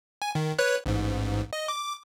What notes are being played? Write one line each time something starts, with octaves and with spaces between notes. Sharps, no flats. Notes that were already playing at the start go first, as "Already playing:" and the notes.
G#5
D#3
B4 C#5 F#6
A1 G#2
D#5
D6